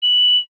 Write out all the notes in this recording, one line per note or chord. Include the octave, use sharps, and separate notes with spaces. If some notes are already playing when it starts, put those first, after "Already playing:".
F#7